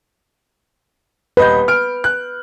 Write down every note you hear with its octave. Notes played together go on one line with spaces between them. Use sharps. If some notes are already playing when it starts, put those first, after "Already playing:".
D#1 B4 D#5 G6
F6 D7
F#6